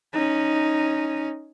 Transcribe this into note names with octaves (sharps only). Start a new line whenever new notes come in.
C#4 D#4